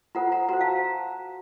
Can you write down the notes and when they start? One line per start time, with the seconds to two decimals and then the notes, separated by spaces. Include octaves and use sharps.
0.15 F4 A4 C5 F#5 A#5
0.32 F#5 A#5
0.49 F#4 C5 F#5 A#5
0.61 F5 A5